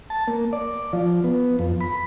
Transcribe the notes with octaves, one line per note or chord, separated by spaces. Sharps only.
A5
A#3
D5
F3
B3
F2
B5